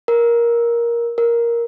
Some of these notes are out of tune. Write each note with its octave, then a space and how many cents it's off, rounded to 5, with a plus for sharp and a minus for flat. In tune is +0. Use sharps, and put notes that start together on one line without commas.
A#4 +10
A#4 +5